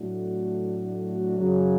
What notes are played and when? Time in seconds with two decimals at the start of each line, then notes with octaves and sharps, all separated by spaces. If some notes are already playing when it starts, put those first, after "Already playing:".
Already playing: A2 F#3 A3 D4 F#4
1.38 F#2 C#3 F#3